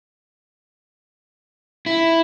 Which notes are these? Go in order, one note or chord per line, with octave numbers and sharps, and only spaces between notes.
E4